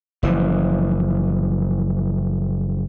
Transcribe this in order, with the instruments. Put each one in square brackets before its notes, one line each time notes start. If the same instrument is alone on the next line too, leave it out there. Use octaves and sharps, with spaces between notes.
[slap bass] F#1 E3 F3